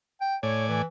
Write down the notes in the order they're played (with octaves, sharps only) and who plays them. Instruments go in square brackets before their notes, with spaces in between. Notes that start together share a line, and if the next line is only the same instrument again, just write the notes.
[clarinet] G5
[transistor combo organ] A2 D5 G#5 [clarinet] C#5
[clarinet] E3